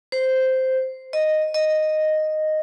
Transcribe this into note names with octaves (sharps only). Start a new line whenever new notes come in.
C5
D#5
D#5